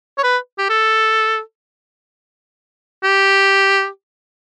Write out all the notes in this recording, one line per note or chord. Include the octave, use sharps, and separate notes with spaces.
C#5
B4
G4
A4
G4